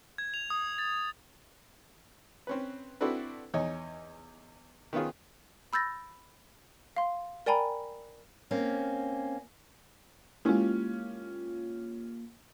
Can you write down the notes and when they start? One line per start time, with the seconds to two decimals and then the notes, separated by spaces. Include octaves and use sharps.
0.18 G#6
0.34 F7
0.50 D#6
0.78 A6
2.47 C4 C#4 B4
3.01 C4 D4 E4 F#4 A4 B4
3.54 E2 D#4 C#5 D#5 G#5
4.93 D#3 B3 C#4 F4 G#4
5.73 B5 E6 G6 A6 A#6
6.97 F5 C6
7.46 A#4 D5 G5 G#5 A#5 B5
8.51 A#3 C4 C#4
10.45 G#3 A#3 C#4 E4 F4 G4